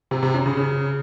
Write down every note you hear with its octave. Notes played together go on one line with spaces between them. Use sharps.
C3
C3
F#2
C#3
C#3